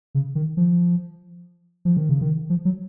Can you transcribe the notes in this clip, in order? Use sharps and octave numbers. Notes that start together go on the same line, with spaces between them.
C#3
D#3
F3
F3
D#3
C#3
D#3
F3
F#3